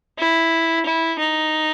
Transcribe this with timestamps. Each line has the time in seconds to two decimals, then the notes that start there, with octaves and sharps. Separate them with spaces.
0.18 E4
0.86 E4
1.19 D#4